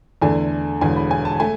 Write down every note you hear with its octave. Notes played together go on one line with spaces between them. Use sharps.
E2 D3 A3 D4 G#5
E1 E2 D3 G#5
B5
G#5
A5
A3 G#5